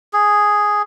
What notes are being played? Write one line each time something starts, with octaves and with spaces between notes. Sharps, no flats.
G#4